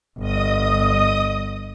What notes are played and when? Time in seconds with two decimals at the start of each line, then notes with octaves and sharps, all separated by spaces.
0.19 G1 D#5 D#6